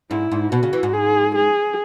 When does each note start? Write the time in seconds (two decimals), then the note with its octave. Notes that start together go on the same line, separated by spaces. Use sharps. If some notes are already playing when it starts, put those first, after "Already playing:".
0.11 G#2 E4
0.32 G#2
0.52 B2 F#4
0.63 C#3
0.73 E3
0.83 G#2
0.93 G#4
1.35 G#4